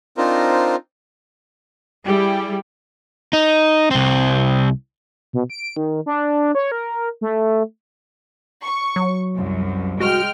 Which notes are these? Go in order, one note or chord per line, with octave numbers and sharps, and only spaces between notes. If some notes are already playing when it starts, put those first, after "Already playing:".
C4 D4 D#4 F4 A#4 C5
G3 E4 G4 G#4
D#4
C2 C4
B2
D7
D#3
D4
C#5
A#4
A3
C#6
F#3
C2 F#2
G#3 F#4 G5 F6